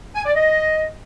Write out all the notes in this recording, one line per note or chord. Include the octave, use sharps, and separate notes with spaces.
G#5
D5
D#5